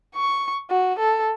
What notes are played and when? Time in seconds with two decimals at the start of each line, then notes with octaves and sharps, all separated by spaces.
0.15 C#6
0.70 F#4
0.99 A4